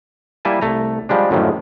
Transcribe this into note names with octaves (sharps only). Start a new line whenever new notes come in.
G3 A#3 E4 G#5 A5
C2 A3 A#5
F3 G3 G#3 D4
F#2 A2 D3 D#3 F3